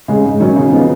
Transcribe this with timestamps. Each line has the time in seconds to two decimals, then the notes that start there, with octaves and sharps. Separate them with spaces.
0.08 C#3 G#3
0.24 G#2
0.40 D#3 F#3 C#4
0.56 C#3
0.72 F3 B3 D#4